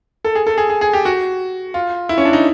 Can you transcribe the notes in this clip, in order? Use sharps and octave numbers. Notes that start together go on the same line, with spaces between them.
A4
G#4
A4
G#4
G#4
G#4
G4
F#4
F4
E4
C#4
D4
D#4